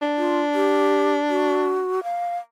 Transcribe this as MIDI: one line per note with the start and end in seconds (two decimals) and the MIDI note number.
0.02 1.85 62
0.17 0.40 65
0.54 1.14 67
1.30 2.03 66
2.03 2.37 77